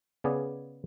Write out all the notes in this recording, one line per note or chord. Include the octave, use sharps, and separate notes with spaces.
C#3 B3 G#4 D5